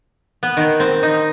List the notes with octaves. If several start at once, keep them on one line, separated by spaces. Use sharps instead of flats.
B3
D#3
C4
D#4